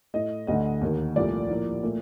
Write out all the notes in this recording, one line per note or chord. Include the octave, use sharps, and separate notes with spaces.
A2 A3 D#5
D2 D3 A3 D#5
D#2 D#3 A#3
C2 A#2 F3 A3 D5
A2 F3 A#3
A#2 A3